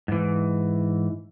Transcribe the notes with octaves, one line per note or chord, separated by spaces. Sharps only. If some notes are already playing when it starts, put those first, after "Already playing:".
G#2 E3